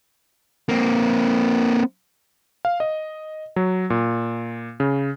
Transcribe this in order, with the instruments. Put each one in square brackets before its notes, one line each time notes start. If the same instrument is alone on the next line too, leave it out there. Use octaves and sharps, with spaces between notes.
[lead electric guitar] A#3 C4
[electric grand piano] F5
D#5
F#3
A#2
C#3